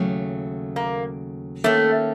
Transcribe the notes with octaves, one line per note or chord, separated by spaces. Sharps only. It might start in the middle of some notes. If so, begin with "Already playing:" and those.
Already playing: D#2 C#3 F#3 A3
A#3
D#3 A3 A#3 C#4